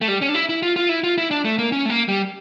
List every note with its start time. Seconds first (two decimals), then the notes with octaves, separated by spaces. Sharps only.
0.01 A3
0.08 G3
0.21 C#4
0.29 D4
0.34 E4
0.49 E4
0.62 F4
0.76 F4
0.89 E4
1.04 F4
1.18 E4
1.31 D4
1.45 A3
1.58 A#3
1.72 C#4
1.86 A3
1.90 A#3
2.08 G3